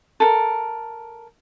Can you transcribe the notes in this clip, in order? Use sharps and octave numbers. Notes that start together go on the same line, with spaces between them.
A4 A#4